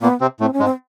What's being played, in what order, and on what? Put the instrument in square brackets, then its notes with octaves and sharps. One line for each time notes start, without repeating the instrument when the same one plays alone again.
[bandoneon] A#2 A#3 [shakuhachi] B3
[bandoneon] C3 C4
[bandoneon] A2 A3 [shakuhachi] C4
[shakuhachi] C#4
[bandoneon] G#2 G#3
[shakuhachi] C4